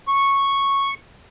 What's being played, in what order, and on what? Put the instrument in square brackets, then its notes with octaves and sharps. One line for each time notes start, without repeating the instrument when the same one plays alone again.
[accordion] C#6